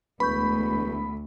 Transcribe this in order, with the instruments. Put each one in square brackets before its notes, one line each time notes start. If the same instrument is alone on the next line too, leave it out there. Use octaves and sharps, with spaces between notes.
[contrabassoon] E1 [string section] D2 [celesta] B4 C#6 G6 [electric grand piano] B5